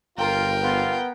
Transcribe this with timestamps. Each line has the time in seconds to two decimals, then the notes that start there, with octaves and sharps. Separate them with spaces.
0.18 G1 F4 A#4 G5
0.63 B3 F4